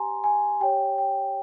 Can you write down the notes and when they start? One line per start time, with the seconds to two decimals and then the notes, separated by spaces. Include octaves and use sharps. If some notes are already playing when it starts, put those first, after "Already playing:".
Already playing: G4 C5 G#5 A#5 C6
0.24 G#5
0.60 G4 C#5 G5
0.98 G5